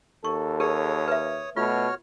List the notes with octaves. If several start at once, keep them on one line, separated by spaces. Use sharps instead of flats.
D#2 A4 C#6
G4 G#4 A#4 C#5 D#6
B4 E5
B2 A3 F4 F#4 C#5 F6